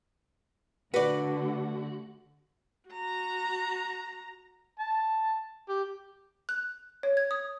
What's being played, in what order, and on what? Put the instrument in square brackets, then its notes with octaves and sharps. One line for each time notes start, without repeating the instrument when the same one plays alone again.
[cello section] D3 A3 [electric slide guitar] F#4 [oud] B4 D5
[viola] F#4 A#5
[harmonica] A5
G4
[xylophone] F#6
C#5
G#6
D#6